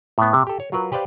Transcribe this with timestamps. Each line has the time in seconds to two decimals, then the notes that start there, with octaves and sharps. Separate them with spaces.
0.18 A2 B3
0.33 C3
0.47 G4 A4
0.60 C#5
0.72 F#3 F4 A#4 B4
0.92 G4 B4 C5 D5 F5